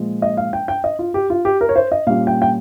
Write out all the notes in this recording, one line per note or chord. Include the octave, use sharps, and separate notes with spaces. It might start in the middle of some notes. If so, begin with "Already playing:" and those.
Already playing: A#2 F3 G#3
D#5
F5
G5
G5
D#5
F4
G4
F4
G4
A#4
C#5
C5
D#5
A#2 G3 C#4 F5
G5
G5